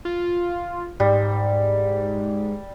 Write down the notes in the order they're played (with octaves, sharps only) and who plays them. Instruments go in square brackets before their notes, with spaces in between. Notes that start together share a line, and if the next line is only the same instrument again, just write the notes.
[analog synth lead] F4
[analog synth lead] G#2 [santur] G3